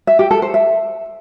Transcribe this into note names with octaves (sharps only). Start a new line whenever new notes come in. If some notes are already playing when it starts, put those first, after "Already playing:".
E5
G4
A4
C5
E5